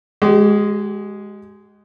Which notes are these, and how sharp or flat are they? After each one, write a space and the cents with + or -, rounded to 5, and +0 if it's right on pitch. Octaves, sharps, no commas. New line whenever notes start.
G#3 +0 G4 -45